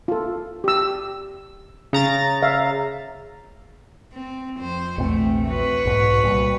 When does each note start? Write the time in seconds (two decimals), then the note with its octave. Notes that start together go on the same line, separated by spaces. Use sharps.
0.08 F4 A4
0.64 G4 E6
1.93 C#3 A#5 A6
2.42 E5 F5
4.13 C4
4.58 F2 C5
4.98 A#1 E2 C3 A3 C4
5.49 F#4 B4 C#5
5.85 B1 G#2 B2
6.23 C2 A#2 G3